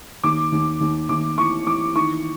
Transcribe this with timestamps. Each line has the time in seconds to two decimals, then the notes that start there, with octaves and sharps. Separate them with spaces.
0.24 D#2 D6
0.52 D#2
0.81 D#2
1.09 D#2 D6
1.38 E3 C#6
1.66 E3 D6
1.95 D#3 C#6